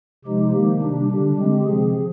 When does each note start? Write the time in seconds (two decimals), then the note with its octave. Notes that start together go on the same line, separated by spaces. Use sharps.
0.25 C3 F3 G#3 D#4 G4
0.53 D#3 A#3 D#4 G4
0.81 C3 G3 D4
1.09 D3 G3 D4
1.37 D3 G#3 C4 G4
1.65 C3 F3 C4 G#4